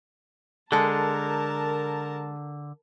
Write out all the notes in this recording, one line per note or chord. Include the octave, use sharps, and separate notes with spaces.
D3 G#3 A4 A#4 A5